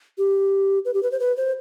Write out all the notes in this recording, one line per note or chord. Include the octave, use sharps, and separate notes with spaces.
G4
B4
G4
B4
C5
B4
C5